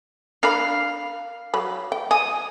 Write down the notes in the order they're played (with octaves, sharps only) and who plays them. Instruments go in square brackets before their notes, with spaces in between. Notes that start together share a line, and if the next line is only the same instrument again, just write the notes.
[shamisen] D4 A#4 B5 [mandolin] F5
[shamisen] F#3 B5
G5
[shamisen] G#5 [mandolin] D#6